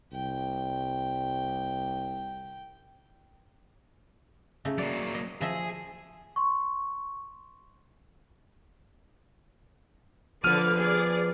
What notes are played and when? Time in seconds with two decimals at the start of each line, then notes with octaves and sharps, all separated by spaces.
0.13 C2 G5
4.65 C#3 A3 D#4
4.78 F#3 A#3 D5
5.14 D#5
5.41 F3 G#4 D#5 E5
6.36 C6 C#6
10.44 D3 F3 B3 B4 D5 F6 D#7
10.77 G#4 D5